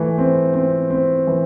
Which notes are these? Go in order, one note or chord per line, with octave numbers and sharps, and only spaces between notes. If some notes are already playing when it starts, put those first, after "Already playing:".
Already playing: E3 A3
C4
C4
C4
E3